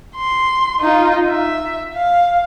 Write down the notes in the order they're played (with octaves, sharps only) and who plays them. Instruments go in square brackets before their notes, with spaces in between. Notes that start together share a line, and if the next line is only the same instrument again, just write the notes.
[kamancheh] C6
D#4 F4
E5
F5